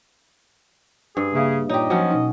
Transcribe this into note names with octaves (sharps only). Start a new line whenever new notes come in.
G2 G#4
C#3 A#3 E5 F5
A#2 D#4 G4 C#5 D#5
F3 F#3 C#4
B2 D#4